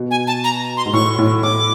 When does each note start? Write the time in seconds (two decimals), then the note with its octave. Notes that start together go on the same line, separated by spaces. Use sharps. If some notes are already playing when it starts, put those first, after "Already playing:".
Already playing: B2
0.11 G#5
0.27 A5
0.44 A#5
0.77 C6
0.86 G#2
0.93 A2 C#6
1.18 A2
1.43 A2 D6